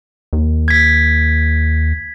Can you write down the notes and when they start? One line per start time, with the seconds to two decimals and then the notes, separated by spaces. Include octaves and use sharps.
0.33 D#2
0.68 G#6 B6